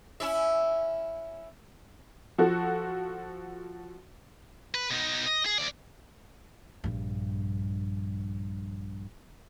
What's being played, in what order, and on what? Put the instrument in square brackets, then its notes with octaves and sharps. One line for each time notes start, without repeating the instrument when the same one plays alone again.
[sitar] C#4 E4 E5
[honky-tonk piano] F3 F#4 A4
[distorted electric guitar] B4
B2 D#4
D#5
G#4
D2 D5
[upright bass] A#1 G2